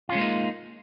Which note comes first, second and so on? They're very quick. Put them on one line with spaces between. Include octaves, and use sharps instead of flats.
F4 C#4 G#3 A#3 D#4